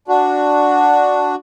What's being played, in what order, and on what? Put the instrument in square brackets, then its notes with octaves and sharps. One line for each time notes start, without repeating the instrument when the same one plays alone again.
[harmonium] D4 F#4